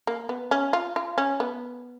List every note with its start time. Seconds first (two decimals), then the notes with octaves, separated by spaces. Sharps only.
0.07 A#3
0.29 B3
0.51 C#4
0.73 F4
0.96 F4
1.18 C#4
1.40 B3